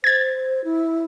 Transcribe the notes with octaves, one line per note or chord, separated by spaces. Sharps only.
C5 G#6 A6
E4